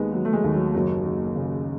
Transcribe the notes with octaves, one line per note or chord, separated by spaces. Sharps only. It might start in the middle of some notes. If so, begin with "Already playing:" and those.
Already playing: D#2 D#3 G#3 B3
D#3 F#3
A3
G#3
D#2
F#3
F#1 F#3
F#1
C#3